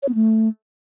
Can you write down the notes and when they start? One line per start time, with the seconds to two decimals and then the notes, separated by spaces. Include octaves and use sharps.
0.03 C#5
0.09 B3
0.15 A3